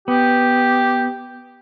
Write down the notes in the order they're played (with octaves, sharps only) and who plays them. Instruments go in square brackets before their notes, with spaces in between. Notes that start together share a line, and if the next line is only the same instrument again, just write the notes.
[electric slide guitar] B3 [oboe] G4